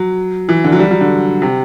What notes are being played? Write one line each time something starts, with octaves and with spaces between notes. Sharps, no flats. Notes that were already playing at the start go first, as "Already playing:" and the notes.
Already playing: F#3
E3
D3
F#3
G3
F#3
D3
C3